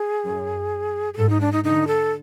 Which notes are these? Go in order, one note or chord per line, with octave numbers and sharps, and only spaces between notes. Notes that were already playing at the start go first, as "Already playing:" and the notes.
Already playing: G#4
F#2
G#4
G#2 A4
D#4
D4
D#4
D3 D#4
A4